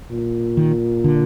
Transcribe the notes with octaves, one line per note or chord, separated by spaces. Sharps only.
A#2
D#3
D3